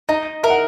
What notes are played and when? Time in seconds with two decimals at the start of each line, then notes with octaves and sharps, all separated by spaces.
0.09 D#4 D#5
0.43 A#4 E5
0.50 F#5